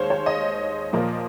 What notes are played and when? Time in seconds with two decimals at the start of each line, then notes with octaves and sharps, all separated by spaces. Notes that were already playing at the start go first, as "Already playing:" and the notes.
Already playing: D#2 G#3 C5 C#5 F5
0.10 C#5
0.26 D#5
0.93 A#2 F3 A#3